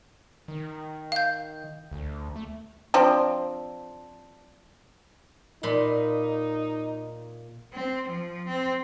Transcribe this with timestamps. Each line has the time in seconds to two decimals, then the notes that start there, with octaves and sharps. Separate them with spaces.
0.48 D#3
1.12 F5 G6
1.92 D2
2.36 A3
2.94 F3 C4 D4
5.63 A#2 D#4 B5 C6
7.73 C4
8.09 F3
8.48 C4